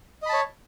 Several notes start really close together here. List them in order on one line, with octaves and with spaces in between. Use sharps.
D#5 B5 A5 C#5